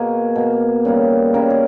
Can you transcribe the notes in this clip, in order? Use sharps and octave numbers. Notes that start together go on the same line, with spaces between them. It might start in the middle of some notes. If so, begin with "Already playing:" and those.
Already playing: B2 A#3 G#4
B2 A#3
C#3 G3 A#3
C#3 G3 A#3 A#4
G#4